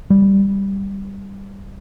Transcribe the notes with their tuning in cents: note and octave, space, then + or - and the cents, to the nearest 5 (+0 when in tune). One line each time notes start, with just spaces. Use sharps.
G3 +5